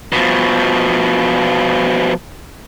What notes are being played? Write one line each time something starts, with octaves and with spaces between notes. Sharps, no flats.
B2 F3